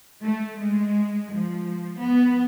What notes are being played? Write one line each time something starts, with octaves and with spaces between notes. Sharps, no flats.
A3
G#3
F3
B3